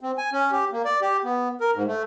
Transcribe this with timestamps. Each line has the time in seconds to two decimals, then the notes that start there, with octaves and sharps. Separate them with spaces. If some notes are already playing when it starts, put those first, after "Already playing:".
0.01 C4
0.18 G#5
0.33 C#4
0.52 G4
0.72 A#3
0.85 D5
1.01 G4
1.24 B3
1.61 A#4
1.75 G#2
1.87 A3